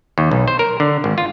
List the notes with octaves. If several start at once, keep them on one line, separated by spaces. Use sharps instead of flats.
D#2
B1
C5
A#4
D3
G#1
F4